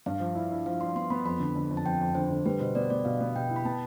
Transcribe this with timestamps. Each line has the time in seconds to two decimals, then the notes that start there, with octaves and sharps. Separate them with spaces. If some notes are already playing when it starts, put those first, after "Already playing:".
0.06 G2 F5
0.20 F3
0.35 E4
0.51 E4
0.66 F3 F5
0.81 F3 C6
0.95 B3 C6
1.10 B3 B5
1.25 F2 B5
1.40 D3
1.56 D3
1.70 F2
1.77 A5
1.85 F2 G5
2.01 F2
2.15 D3 C5
2.30 D3
2.45 G3 B4
2.60 B2 C5
2.75 B3 D5
2.90 B3 D5
3.05 B2 F5
3.20 B3
3.35 B2 G5
3.49 E4
3.56 B5
3.65 B3 A5